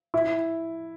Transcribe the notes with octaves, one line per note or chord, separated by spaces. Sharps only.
E4